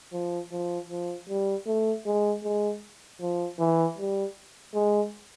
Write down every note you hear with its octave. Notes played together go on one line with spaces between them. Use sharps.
F3
F3
F3
G3
A3
G#3
G#3
F3
E3
G3
G#3